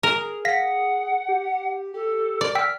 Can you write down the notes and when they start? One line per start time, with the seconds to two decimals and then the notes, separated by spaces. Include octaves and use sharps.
0.03 G#4 A#4
0.45 F5 F#5 A#6 B6
1.28 G4
1.94 G4 A4
2.41 A#4 D5
2.55 G5 E6 F6 B6